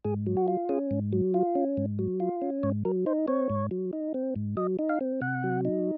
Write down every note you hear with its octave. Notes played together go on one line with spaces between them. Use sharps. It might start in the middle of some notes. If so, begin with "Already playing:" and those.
G#2 G#4
F#3
F#4
F4
C#4 G#4
G#2
F#3
F4
C#4
G#2
F#3
F4
C#4
G#2 C#5
F#3 A#4
D#4 C5
C4 C#5
G#2
F#3
D#4
C4
G#2
F#3 D#5
D#4
F5
C4
C3 F#5
F#3
D#4